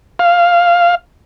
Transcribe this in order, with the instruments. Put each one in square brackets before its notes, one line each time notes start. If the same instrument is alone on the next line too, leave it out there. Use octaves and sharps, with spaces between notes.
[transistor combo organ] F5